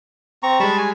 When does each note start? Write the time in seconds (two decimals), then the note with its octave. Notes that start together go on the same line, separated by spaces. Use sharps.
0.43 C4 A#5 C#6
0.60 G3 G#3 A5 B5 C#6
0.78 G#5